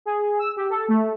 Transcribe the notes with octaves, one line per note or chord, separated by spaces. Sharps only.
G#4
E6
G4
A4
A3